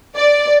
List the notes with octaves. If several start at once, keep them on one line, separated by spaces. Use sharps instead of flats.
D5